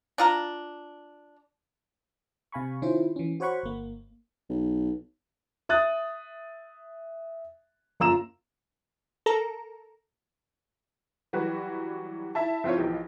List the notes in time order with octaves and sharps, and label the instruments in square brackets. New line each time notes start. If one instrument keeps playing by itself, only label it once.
[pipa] D4 F4 A#5
[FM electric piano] C3 F5 G#5 B5 C#6
D#3 C#4 E4 F4 C5
E3 C#4
F#4 C5 C#5 F#5 B5 C#6
G1 A#3
[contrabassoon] B1
[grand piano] E5 D#6 F#6 A6
F#1 F4 A#5 E6 E7
[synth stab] A4 A#4 A#5
[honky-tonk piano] E3 F#3 G3 F#4 G4 B4
E4 E5 A5
F3 C4 E4 F4 C#5
B1 E3 F3 G4 G5